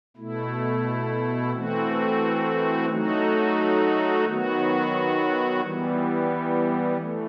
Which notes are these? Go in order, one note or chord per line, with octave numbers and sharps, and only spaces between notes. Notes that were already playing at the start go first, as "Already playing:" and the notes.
B2 A3 E4
E3 A3 C4 F#4
F#3 A3 D#4 F#4
D#3 F#3 B3 F#4
E3 G3 B3
E3 A3